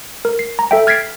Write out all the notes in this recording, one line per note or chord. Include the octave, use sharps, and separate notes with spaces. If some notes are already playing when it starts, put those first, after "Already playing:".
A#4
C7
A#5
A4 E5 G5
F6 G#6 A6 B6 C7 D7